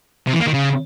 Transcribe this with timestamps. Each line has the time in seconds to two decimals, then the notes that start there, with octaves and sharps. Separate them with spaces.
0.27 C3
0.33 E3
0.40 A#3
0.46 D#3
0.53 C#3